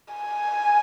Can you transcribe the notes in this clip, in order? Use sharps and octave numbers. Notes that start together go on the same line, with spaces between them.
G#5